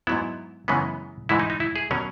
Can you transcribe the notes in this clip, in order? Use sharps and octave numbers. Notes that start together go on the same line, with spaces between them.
G#2 F#3 B3 E4
F#2 C#3 E3 G#3 B3
G#2 E3 G#3 E4
D#4
D#4
E4
G#4
B2 F#3 C#4 A#4